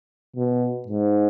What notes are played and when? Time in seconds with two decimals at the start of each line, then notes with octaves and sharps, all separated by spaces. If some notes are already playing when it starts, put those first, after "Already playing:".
0.36 B2
0.88 G#2